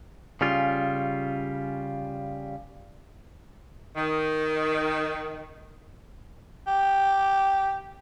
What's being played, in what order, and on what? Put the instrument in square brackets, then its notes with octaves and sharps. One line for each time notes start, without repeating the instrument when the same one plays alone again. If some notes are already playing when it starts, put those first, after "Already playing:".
[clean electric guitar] C#3 G3 F4
[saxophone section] D#3
[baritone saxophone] G4